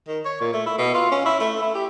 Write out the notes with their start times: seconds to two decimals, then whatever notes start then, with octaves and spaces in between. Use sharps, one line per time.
0.08 D#3
0.25 C#5
0.41 A#2
0.54 A3
0.66 E4
0.78 B2
0.94 F4
1.11 C#4
1.25 E4
1.40 A3
1.62 E4
1.75 G4